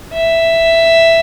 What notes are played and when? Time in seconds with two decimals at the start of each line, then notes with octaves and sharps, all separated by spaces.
0.13 E5